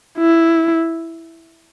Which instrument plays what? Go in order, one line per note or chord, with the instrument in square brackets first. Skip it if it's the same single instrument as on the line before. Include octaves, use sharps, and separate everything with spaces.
[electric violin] E4